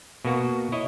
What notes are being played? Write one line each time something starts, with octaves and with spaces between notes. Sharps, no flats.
B2 A#3 F#4
E4 C#5 D#5